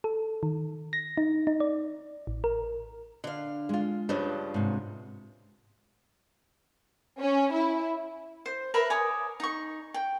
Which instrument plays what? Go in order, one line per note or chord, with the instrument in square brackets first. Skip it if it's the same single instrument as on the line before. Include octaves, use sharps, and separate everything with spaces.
[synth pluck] A4
D#3
A#6
D#4
D#4
D5
A1
A#4
[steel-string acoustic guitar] D3 F5
[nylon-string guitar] G#3 F4
[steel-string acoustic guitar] G2 C#3 F3 [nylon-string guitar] D4
[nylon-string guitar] G#2 C3
[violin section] C#4
E4
[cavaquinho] C5
A#4 B4 E5 B5
C#5 G#5 D6 D#6
D#4 C#6
G5